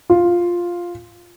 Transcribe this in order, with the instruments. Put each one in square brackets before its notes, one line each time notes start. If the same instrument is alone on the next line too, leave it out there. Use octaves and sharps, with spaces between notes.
[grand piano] F4